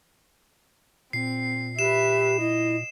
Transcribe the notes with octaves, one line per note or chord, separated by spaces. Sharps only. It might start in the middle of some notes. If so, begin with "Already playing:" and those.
A#2 C4 C7
G4 B4 E5 E7
E4 D#5